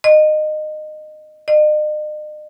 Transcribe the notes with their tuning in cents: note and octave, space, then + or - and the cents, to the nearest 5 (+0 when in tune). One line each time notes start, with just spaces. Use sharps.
D#5 -20
D#5 -45